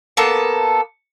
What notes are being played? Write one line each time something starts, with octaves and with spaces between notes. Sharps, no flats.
A#3 B3 A4